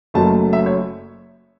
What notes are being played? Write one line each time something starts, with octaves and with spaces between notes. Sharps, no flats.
F#1 F#2 F#3 A3 A5
E5
C#5